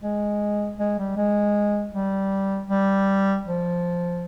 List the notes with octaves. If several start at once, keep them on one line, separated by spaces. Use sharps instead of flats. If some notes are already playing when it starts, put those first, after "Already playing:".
G#3
G#3
G3
G#3
G3
G3
F3